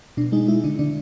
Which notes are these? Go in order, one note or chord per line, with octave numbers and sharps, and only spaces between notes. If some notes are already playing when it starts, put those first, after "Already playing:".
B2 D4
G#3 D#4
G#3 E4
D3 D4
D3 D4